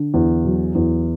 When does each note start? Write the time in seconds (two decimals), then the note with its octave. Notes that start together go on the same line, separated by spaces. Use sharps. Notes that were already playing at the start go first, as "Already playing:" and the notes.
Already playing: D3
0.14 E2
0.45 F#3
0.75 E2